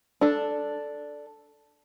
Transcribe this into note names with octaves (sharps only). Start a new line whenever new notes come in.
D4 A4